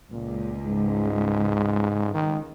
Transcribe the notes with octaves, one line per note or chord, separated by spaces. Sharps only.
C#2 A#2
G#2
D#3